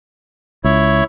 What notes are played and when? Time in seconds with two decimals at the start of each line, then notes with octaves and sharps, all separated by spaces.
0.64 C#2 E4 C#5